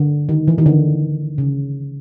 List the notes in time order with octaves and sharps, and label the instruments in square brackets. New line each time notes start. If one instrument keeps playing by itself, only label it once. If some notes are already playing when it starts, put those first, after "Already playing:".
Already playing: [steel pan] D3
D#3
E3
D#3
D3
C#3